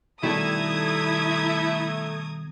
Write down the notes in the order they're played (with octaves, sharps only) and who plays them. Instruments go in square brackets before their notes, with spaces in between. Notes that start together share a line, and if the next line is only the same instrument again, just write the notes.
[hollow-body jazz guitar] B2 D#3 G3 [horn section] A3 [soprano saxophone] E4 [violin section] A#5 D#6 G#6